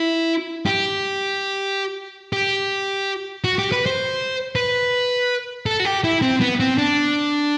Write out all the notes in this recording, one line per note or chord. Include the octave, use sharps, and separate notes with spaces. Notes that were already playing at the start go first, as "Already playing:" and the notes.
Already playing: E4
G4
G4
F#4
G4
B4
C5
B4
A4
F#4
G4
E4
C4
B3
C4
D4